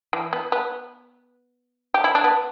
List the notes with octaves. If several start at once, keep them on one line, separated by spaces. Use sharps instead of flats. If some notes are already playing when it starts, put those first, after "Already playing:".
E3
B3
B3
G4
E4
D4
B3